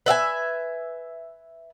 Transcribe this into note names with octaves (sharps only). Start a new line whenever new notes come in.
B4 E5 F#5 G#5